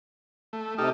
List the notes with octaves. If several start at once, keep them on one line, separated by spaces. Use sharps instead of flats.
A3
C3 D#4 G4 A4 D#6 F6